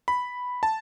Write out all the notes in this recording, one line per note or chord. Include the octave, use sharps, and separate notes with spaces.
B5
A5